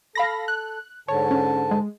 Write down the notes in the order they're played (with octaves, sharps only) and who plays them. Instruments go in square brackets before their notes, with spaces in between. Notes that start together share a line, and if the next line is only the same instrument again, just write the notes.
[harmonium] A4 [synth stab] F5 B5 A#6
[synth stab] F#6
[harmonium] G#2 D3 A5 [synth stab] C#5
[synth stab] C#4
G#3